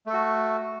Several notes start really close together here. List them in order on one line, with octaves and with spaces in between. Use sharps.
A3 A4 F#4